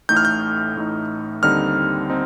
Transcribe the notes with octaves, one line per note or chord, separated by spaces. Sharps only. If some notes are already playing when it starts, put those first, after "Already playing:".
A1 A2 A3 D#4 G6
F6
G6
A1 A2 A3 D#4
D#2 D3 G3 C4 D#4 F6
C4 D#4